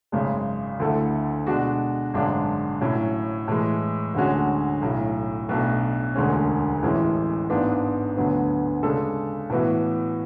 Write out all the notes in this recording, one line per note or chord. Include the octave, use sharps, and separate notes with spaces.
G#1 F#2 C#3 G#3
D2 D3 A3 E4 A4
B2 G#3 D4 F#4
G#1 F#2 D3 G#3 D4
A2 F#3 C#4
A2 E3 G#3
D2 D3 G#3 C#4 F#4
B1 A2 F#3
B1 B2 A3 D4
E1 D2 D3 G#3 C#4
A1 A2 E3 G#3 C#4
G#1 G#2 G#3 B3 D4
D2 D3 F#3 B3
C#3 G#3 D4 A4
A2 E3 B3 F#4